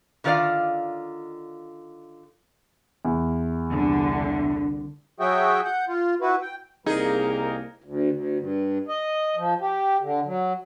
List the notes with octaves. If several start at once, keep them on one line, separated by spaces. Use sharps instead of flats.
D3 D#3 F4 A#4 D5 F5
E2
C2 D3
F#3 F#4 G#4 E5 G5
F#5 G6
F4
E4 F#4 B4
G5
C2 A#3 D#4 G#4 A#4
D2
D2
G2
D#5
F3
G4
D3
F#3